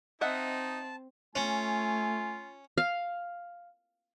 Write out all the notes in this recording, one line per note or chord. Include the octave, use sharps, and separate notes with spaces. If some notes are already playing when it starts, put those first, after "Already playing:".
C4 D#4 D#5 E5 F#5 A5
A3 C#4 F4 G#5
F5